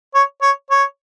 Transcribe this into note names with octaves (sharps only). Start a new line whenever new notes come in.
C#5
C#5
C#5